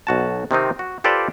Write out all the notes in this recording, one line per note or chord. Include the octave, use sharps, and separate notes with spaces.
B1 F#4 A5
C3 D#3 C4 D#4
F#4
F4 G4 A4 B4 C5 D5